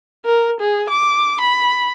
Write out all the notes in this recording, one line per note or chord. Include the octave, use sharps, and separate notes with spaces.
A#4
G#4
D6
B5